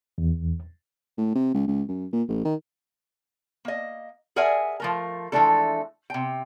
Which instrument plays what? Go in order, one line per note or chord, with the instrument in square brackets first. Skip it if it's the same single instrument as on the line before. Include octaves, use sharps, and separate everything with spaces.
[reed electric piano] E2
[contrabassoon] A2
C3
C#2
C#2
F#2
A#2
A1
D#3
[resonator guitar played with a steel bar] A#3 D#5
G#4 A#4 D5 E5 F#5 G#5
F3 A3 A#4
E3 F3 G#3 A3 D4 A4
C3 G5